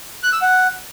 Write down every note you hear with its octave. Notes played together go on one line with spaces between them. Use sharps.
F#6
E6
F#5